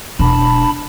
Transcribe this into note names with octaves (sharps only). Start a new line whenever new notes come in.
E1 D4 A5 B5